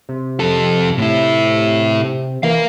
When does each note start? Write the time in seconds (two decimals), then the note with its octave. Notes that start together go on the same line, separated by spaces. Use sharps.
0.09 C3
0.40 F2 A4
0.98 A2 E4
2.43 E3 A#4 F5